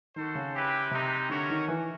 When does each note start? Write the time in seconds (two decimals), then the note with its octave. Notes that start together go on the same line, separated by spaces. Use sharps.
0.15 D#3 F#4 A4 C5
0.35 C#3
0.53 C4 E4 G4 B4
0.91 C3 G#3 C4 D#4 G4
1.29 D3 A3 C#4 F#4 A#4 C#5
1.50 D#3
1.68 E3